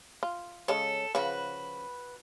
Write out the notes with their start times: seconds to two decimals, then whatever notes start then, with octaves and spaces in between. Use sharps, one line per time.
0.23 F4
0.68 C#3 G#3 A4 C#5
1.15 C#3 F3 F#4 B4